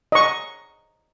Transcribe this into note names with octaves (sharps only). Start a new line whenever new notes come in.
D#5 C#6